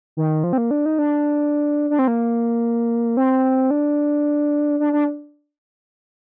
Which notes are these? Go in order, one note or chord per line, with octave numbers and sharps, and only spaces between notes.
D#3
F3
C4
A#3
D4
D#4
D4
D4
C4
A#3
C4
D4
D4
D4